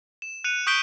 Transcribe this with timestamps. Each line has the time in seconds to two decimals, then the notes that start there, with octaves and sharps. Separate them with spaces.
0.22 E7
0.44 F#6 C#7 D#7 F7
0.67 C#6 D#6 G6 B6 D7 G7